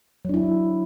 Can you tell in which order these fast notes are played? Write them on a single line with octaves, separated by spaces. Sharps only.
F#3 D4 E4